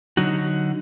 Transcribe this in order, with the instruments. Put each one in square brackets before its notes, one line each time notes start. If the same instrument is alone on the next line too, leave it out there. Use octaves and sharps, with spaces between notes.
[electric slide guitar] D3 F#3 D#4 F#4